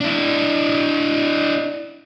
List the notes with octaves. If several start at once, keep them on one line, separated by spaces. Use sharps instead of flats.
D4 E4